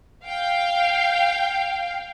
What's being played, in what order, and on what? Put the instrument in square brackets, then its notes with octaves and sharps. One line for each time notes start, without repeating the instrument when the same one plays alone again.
[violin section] F5 G5